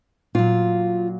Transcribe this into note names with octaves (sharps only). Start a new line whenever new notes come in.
A#2 F#3 F4